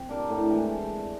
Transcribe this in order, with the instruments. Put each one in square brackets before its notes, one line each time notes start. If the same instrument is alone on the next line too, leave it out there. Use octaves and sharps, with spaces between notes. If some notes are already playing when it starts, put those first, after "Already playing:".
Already playing: [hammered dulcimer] C4
D4 G4 A#4
A2
E3 G#3